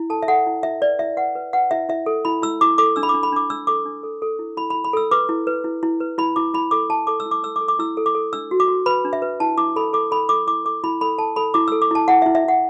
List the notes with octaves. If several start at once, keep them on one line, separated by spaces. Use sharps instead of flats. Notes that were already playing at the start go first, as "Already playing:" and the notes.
Already playing: E4
A4 A5
E5
A4 F#5
E4
E4 E5
B4 D5
E4 E5
B4 F#5
B4
B4 F#5
E4 E5
E4 E5
A4
E4 B5
E4 E6
E4 D6
A4 D6
D4 E6
B5
D4 D6
B5
D4 D6
D4 E6
A4 D6
D4
A4
A4
E4
E4 B5
E4 B5
B5
A4 E6
B4 D6
E4
B4
E4
E4
B4
E4 B5
E4 D6
E4 B5
A4 D6
E4 A5
A4 D6
E6
E4
D6
A4 E6
D6
A4
D6
E4 E6
A4
D6
A4
D4 E6
F#4
D6
F#4
B4 B5
D4
E5
B4
E4 A5
E4 D6
A4 B5
A4 D6
A4 B5
A4 D6
E4 D6
A4 D6
E4 B5
A4 B5
A4 A5
A4 B5
E4 D6
A4 E6
D6
E4 A5
E4 F#5
E5
E4
E5
E4 F#5